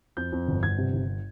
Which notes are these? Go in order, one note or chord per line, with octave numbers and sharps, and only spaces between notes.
F2 G6
F2
G1
G1 G#6
C3
G1